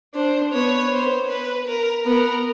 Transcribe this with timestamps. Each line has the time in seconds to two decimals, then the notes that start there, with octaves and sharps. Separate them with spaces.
0.14 D4 C5
0.53 B3 C#5
0.92 C5
1.29 B4
1.67 A#4
2.05 B3 A#4